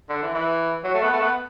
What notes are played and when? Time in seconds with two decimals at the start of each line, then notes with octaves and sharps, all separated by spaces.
0.09 D3
0.22 E3
0.34 E3
0.84 F#3
0.94 A3
1.03 B3
1.13 A3
1.22 B3